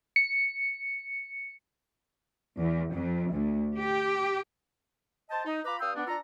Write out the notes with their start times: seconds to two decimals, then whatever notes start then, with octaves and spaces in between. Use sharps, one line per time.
0.16 C#7
2.59 E2
2.92 F2
3.32 D2
3.77 G4
5.30 C5 D#5 G5 A5
5.46 D#4
5.65 F4 B4 A#5 B5 D6
5.80 G2 F5 G5 D#6 E6
5.95 B3 D4
6.07 D4 F4 A4 A#5